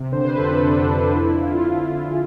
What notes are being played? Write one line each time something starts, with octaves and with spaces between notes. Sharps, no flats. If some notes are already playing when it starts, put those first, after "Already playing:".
Already playing: C3
D3 C5
B4
F2 A4
D4
D3 D4
D3
F2 E4
F2 F4
F2 E4
F2
G#4